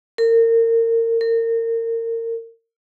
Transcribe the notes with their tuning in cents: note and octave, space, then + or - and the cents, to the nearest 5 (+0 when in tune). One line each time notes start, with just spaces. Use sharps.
A#4 -30
A#4 -30